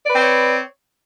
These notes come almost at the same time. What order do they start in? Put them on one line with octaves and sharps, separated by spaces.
D5 B4 C4 C#5